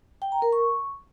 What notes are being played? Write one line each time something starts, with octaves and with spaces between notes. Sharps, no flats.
G5
A#5
A#4
C#6